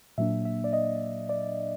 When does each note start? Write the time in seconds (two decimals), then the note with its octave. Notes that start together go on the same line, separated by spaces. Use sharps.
0.18 A#2 F#3 A#3 D4 E5
0.45 E5
0.64 D5
0.73 D#5
1.29 D5